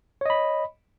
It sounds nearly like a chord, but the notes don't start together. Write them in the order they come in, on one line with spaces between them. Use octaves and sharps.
C#5 D#5 B5